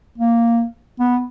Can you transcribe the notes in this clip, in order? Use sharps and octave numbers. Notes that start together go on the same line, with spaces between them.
A#3
B3